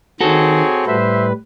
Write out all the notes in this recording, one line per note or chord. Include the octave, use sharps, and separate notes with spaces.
D#3 C4 F#4 G#4 A4 C#5
A2 G3 B4 C5 E5